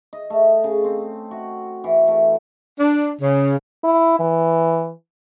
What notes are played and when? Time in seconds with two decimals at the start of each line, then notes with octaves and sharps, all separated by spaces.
0.13 D#5
0.30 A3
0.64 C#3
0.84 C4
1.31 F#4
1.84 E3
2.08 A3
2.78 D4
3.22 C#3
3.84 E4
4.20 E3